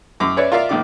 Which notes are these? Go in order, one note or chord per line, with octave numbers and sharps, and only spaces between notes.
F#2 D6
C#4 B4 C#5 D5 E5
F4 A#4 D5 E5 F5
A#1 D#3 D6